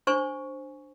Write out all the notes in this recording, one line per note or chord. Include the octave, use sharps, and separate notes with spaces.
D4 C5 G#5 C#6